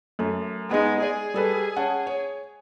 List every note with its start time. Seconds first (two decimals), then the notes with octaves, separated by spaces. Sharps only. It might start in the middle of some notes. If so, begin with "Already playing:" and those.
0.19 F#2 A3
0.71 G#3 B3 D#4
1.02 G#4 D5
1.34 G3 A4 B4
1.76 C#4 F#5 A5
2.07 C#5